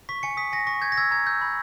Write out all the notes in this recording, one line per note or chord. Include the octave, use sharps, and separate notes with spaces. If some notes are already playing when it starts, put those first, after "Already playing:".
C#6 B6
G#5 C#7
D#6 B6
G#5 A#6
C#6 A#6
G6 G#6
A#6
E6 G#6
A#5 G#6
E6 G6
B5